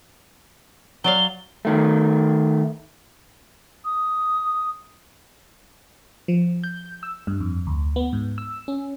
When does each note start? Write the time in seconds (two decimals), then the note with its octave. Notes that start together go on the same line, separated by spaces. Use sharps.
1.04 F#3 D5 F5 G7
1.65 D#3 A3
3.85 D#6
6.28 F3
6.64 G6
7.03 E6
7.27 G2
7.40 F2
7.67 D2
7.96 B3
8.13 G#2
8.38 E6
8.68 C#4